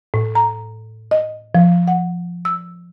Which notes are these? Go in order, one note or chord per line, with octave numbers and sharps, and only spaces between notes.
A2
A#5
D#5
F3
F#5
E6